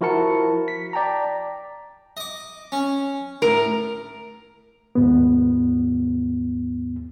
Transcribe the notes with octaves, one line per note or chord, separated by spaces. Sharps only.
F3 E4 F#4 A#4 A5 C#7
B6
D5 G5 A5 A#5
D#5 D6
C#4
A2 A#4
D#2 G#2 B3